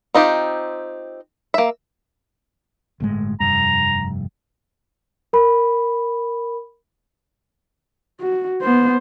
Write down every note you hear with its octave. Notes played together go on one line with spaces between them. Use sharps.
C4 D#4 F4 G4
A#3 E5
G1 A2 G#3
F1 G2 A#5
A#4 B5
F#4
B3 C5